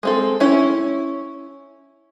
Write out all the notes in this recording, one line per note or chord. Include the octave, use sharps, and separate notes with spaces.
G#3 C4 A4
C#4 E4